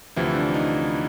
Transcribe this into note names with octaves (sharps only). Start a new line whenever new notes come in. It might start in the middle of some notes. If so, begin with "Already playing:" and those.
D2 C3 E3 F3 E4
D4
D#4